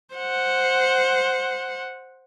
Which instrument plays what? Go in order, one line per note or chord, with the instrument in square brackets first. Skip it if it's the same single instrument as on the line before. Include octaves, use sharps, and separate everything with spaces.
[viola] C5 F#5